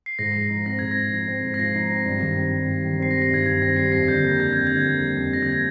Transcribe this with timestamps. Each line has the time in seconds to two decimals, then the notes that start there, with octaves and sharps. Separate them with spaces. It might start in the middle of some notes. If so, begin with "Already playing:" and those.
0.06 C7
0.19 G#2 A#6
0.35 F3
0.50 D#4
0.66 C4 A#6
0.79 G#2 G#6
0.91 A#6
0.97 F3
1.13 D#4
1.28 C4
1.43 G#2
1.54 A#6
1.59 F3 C7
1.75 D#4
1.90 C4
2.06 G2
2.21 D#3
2.37 C4
2.53 G3
2.68 G2
2.84 D#3
3.00 C4 C7
3.11 A#6
3.15 G3
3.22 A#6
3.31 G2 G#6
3.46 D#3 G#6
3.62 C4 A#6
3.76 G3 C7
3.92 F2 A#6
4.08 D3 G6
4.23 A#3 G6
4.40 G3 G#6
4.53 F2 G6
4.67 D3 G#6
4.86 A#3
5.02 G3
5.17 F2
5.33 D3 A#6
5.43 G#6
5.48 A#3 A#6